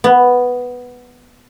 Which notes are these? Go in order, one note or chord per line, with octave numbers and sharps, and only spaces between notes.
B3